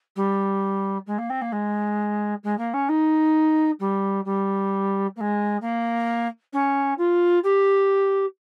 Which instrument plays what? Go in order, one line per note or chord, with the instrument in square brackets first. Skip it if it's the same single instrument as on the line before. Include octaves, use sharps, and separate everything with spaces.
[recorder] G3
G#3
A#3
C4
A#3
G#3
G#3
A#3
C#4
D#4
G3
G3
A#3
G#3
A#3
C#4
F4
G4